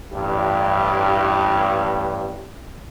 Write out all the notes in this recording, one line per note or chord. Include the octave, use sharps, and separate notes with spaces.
A1 G2